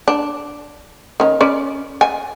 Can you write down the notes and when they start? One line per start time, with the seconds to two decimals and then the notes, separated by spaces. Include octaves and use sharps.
0.08 D4
1.20 D#3 C#4
1.41 C#4 D5
2.01 G#5